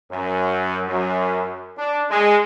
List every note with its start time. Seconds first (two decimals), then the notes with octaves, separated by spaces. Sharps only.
0.11 F#2
0.88 F#2
1.78 D4
2.10 G#3